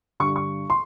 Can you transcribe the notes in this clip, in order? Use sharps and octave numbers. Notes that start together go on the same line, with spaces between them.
G2 D3 G3 C#6
C#6
C6